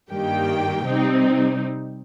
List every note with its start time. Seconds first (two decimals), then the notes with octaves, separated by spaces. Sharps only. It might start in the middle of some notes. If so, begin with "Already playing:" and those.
0.12 G2 D#3 G3 A#3 G4 G5
0.85 C3 G3 C4 D#4